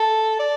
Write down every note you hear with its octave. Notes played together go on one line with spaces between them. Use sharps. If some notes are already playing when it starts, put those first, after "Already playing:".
Already playing: A4
D5